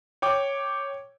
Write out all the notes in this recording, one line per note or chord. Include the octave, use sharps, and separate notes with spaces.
C#5 G5 D6